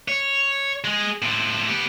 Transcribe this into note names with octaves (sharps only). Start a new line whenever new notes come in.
C#5
G#3 G#4
A2 C4
B3 G4